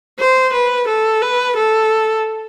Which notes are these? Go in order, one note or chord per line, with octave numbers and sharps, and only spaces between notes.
C5
B4
A4
B4
A4